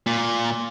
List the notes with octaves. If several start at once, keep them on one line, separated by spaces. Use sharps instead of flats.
A#2